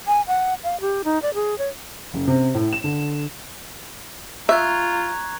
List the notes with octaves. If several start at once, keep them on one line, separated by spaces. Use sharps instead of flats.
G#5
F#5
F5
G4
D#4
D5
G#4
C#5
F#1
C3
A2
E7
D3
F4 E5 A#5 C#6 F#6 G#6